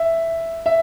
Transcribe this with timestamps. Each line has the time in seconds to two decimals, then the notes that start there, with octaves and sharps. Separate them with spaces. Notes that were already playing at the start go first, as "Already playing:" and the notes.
Already playing: E5
0.66 E5